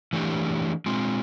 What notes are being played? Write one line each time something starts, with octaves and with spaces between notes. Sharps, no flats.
E3 A3 D4 G4
G#3 C4 F4